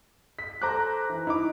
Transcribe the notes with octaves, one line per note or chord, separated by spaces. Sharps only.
B6
A4 C5 A#5 D6 F#6
E3
D#4 E4 D6